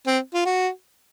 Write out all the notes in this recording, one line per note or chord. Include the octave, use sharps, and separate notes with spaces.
C4
F4
F#4